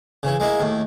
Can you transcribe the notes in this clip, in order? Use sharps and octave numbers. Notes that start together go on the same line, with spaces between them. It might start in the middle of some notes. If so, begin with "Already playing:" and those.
C#3 E3
G#3 A#3 E4
D#2 A2